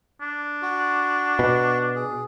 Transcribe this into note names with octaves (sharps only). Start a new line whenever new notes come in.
D4
F#4
B2
G#4